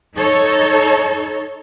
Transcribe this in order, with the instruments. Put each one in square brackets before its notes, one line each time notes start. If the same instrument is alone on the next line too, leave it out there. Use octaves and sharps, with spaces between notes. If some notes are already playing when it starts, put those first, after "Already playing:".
[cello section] D#4 A4 C#5